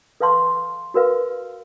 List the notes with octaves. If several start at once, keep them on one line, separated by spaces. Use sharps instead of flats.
A4 B4 F5 A5 C6 C#6
F#4 A#4 B4 F5